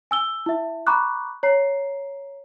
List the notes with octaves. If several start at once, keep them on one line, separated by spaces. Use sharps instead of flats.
G#5 E6 G7
E4 E5
A#5 B5 C#6 D6 F#6
C#5 A#5 C7